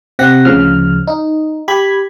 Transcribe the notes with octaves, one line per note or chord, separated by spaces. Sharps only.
C3 C4 G4 F#5 A#6
D2 C#3 F3 F6
D#4
G4 B5 G#6